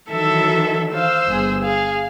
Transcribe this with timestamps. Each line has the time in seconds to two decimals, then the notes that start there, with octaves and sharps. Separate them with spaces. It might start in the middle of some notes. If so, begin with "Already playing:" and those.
0.10 D#3 E3 F#3 A4 E5
0.94 C5 F5 E6
1.27 G1 G#4
1.64 G#4 F5